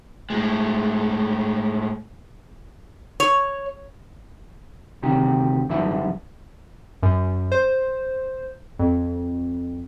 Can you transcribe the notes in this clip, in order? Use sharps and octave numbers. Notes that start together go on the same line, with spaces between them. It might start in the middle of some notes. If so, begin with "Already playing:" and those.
A2 G#3
C#5
D2 C3 D#3 G4
F#2 D3 E3 G3 D#4 E5
F#2
C5
F2